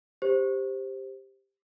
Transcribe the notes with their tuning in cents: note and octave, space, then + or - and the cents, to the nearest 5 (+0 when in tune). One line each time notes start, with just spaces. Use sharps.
G4 +10 C5 +0